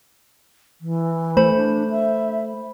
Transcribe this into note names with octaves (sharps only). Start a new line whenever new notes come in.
E3
A3 C5 B5
D4
E5